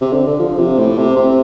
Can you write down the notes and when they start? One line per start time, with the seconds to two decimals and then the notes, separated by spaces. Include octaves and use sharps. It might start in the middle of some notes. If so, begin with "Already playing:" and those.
0.01 C3
0.13 D3
0.27 D3
0.39 F3
0.59 C3
0.78 A2
0.98 C3
1.16 C3